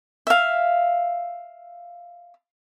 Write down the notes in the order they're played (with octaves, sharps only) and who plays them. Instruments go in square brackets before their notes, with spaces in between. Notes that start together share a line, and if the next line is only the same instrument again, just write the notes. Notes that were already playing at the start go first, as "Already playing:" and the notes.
[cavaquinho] E5 F5